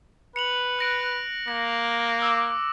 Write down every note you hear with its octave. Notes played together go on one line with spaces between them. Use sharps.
B4 C#7 F7 F#7
F#6 A#6 D7
A#3 A#6
D6 E6